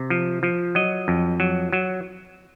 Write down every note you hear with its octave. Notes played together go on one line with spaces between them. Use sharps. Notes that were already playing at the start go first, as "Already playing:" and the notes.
Already playing: C3
F3
F3
F#3 D#5
F2
F#3
F#3